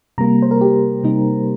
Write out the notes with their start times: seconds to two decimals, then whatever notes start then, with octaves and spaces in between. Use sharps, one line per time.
0.18 C3 G3 A#3 A#5
0.42 C5
0.51 A#4
0.61 G4
1.04 C3 G3 A#3 D#4